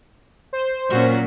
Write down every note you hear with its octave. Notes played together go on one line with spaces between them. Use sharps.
C5
A#2 F#3 C#4 F#4